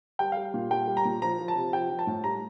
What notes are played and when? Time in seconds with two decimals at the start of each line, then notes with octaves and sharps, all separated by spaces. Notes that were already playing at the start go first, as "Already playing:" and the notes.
0.19 G3 G5
0.32 G3 F5
0.54 A#2
0.71 G3 G5
0.88 G3
0.97 A#5
1.05 A#2
1.22 F3 A#5
1.39 F3
1.48 A5
1.56 C3
1.73 F3 G5
1.90 F3
1.99 A5
2.07 A2
2.24 G3 A#5